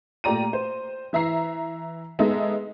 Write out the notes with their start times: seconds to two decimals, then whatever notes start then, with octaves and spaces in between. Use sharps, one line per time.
0.24 A#2 A3 G4 D5 A#5 D#7
0.53 C5
1.13 E3 E5 A#5 C7
2.19 G#3 B3 D#4 A4 D#5 E5